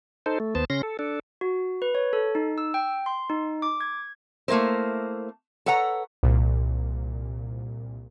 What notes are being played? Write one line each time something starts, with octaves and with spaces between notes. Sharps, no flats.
D#4 A4 C5
A3
D#2 B3 C5 A5
C#3 C#4 C6 A#6
A4
D4 A4
F#4
B4
C#5
A4
D#4
E6
G5
C6
D#4
D6
G#6
A3 A#3 E4 A#4 C5
A4 B4 C#5 F#5 A#5
C2 A#2